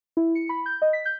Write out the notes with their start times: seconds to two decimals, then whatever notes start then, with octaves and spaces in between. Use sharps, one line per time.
0.17 E4
0.35 C#7
0.49 B5
0.66 G6
0.82 D#5
0.93 B6
1.05 G6